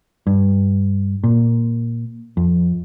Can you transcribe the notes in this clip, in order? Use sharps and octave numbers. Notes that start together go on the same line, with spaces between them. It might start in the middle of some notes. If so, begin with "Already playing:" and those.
G2
A#2
F2